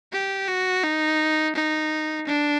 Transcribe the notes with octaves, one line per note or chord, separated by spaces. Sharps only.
G4
F#4
D#4
D#4
D4